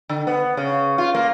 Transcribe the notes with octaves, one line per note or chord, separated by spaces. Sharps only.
D3
B3
C#3
F4
A#3